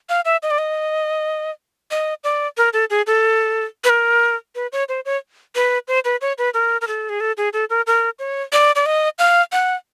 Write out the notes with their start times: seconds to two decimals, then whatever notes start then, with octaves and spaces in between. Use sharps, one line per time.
0.09 F5
0.25 E5
0.43 D#5
0.51 D5
0.58 D#5
1.91 D#5
2.24 D5
2.58 A#4
2.73 A4
2.90 G#4
3.07 A4
3.84 B4
3.89 A#4
4.55 B4
4.72 C#5
4.89 C5
5.05 C#5
5.55 B4
5.88 C5
6.05 B4
6.21 C#5
6.38 B4
6.54 A#4
6.81 A#4
6.87 A4
7.09 G#4
7.20 A4
7.37 G#4
7.53 A4
7.70 A#4
7.87 A#4
8.19 C#5
8.53 D5
8.76 D5
8.86 D#5
9.19 F5
9.52 F#5